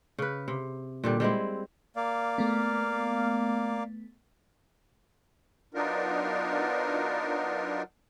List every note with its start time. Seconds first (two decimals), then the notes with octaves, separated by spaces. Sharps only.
0.18 C#3 B4
0.48 C3
1.04 A#2 D3 G3
1.20 G3 G#3 C4 E4
1.96 A#3 D5 F5
2.38 A3 B3
5.74 F#3 B3 D4 D#4 F4 A#4